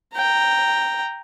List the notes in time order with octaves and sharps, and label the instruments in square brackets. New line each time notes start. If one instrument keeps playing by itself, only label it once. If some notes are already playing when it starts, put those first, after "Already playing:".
[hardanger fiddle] G5 A#5